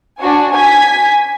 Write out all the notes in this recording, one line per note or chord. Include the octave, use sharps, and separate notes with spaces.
D4 F#4 G#5
G#5 G#6 B6